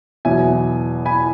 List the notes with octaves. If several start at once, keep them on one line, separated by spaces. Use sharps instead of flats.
E2 B2 F#3 E5 G#5
G#5 B5